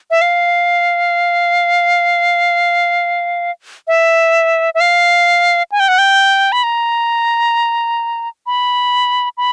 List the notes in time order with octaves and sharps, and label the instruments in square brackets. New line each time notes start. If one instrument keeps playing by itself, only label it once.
[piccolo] E5
F5
E5
E5
F5
G#5
G5
F#5
G5
B5
A#5
B5
B5